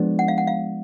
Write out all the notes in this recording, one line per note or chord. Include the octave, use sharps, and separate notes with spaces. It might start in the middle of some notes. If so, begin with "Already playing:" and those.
Already playing: F3 G#3 B3 D4
F#5
F5
F#5
F5